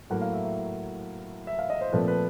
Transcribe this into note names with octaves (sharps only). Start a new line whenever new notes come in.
A2 F#3 A#3 F#5
F5
E5
E5
E5
F5
D#5
C5
A#2 F3 A3 C4 B4
B4